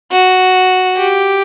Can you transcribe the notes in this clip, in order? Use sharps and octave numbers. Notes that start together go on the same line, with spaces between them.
F#4
G4